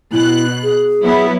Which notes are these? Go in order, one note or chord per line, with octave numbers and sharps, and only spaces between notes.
B2 E4 F#6
G#4
F#3 B3 E4